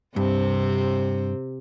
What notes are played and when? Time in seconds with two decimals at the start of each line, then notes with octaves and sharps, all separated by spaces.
0.16 G2 C3 C4